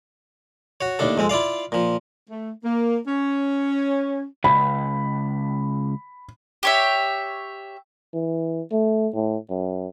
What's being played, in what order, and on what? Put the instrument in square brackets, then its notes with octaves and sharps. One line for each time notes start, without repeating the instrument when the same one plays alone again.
[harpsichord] F#4 C#5
D#2 A2 D4 A4
F2 G#3 C4
E4 F4 D5 F5
A#2 F3
[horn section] A3
A#3
C#4
[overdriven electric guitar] C#2 [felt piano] B5
[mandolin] G4 C#5 E5
[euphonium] E3
A3
A2
F#2